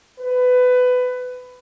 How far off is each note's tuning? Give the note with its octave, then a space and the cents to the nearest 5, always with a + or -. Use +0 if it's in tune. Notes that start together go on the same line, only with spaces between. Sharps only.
B4 +20